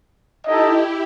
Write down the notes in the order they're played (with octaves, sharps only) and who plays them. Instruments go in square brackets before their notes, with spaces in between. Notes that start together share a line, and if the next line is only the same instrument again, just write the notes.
[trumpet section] D#4 A4 D#5 [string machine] E4 G4